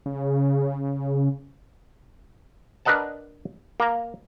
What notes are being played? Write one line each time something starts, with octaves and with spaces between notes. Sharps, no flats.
C#3
D4 A#4 B4 D#5 F#5 A5
A#3 A#5